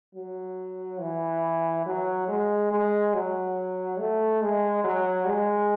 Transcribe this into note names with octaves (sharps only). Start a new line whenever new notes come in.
F#3
E3
F#3
G#3
G#3
F#3
A3
G#3
F#3
G#3